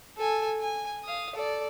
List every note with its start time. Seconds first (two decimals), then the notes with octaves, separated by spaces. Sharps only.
0.17 A4 G#5
0.61 G#5
1.04 F5 D#6
1.35 A4 D5